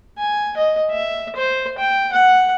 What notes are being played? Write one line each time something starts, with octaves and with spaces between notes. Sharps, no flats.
G#5
D#5
E5
C5
G5
F#5